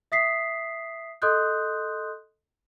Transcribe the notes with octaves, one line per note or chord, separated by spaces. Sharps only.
E5 D#6 B6 C7
A4 D#5 C6 D#6 F#6 G6